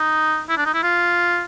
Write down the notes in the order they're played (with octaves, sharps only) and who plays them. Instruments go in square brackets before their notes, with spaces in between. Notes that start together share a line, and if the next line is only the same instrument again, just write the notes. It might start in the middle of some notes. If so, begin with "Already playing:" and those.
Already playing: [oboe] D#4
E4
D4
D#4
E4
F4